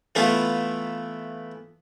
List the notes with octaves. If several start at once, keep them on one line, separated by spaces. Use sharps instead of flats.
E3 A3 B3 E4 F4